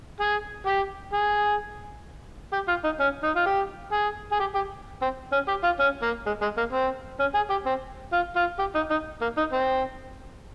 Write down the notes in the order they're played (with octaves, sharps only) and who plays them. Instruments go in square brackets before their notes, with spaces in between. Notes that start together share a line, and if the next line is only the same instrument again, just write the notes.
[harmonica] G#4
G4
G#4
G4
F4
D#4
C#4
D#4
F4
G4
G#4
G#4
G4
G4
C4
C#4
G4
F4
C#4
A#3
G#3
G#3
A#3
C4
C#4
G#4
G4
C4
F4
F4
G4
D#4
D#4
A#3
D#4
C4